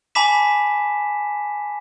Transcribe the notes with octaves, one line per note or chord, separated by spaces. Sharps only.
G#5 A5 B5 D6 B6 E7